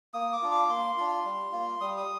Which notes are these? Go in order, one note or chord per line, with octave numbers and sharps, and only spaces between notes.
A#3 D#6
D6
D4 F4
D6
A#3 C6
D4 F4
G3
A#3 F4
G3 D#6
D#6